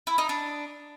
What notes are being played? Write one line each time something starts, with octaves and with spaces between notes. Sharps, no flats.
E4
D#4
D4